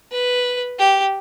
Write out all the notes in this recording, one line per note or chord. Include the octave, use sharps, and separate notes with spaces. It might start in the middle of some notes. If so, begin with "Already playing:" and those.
B4
G4